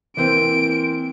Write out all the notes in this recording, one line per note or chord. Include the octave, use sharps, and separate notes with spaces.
E3 A#3 C4 D7